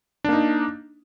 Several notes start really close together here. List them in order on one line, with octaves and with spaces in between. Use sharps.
D4 A#3 D#4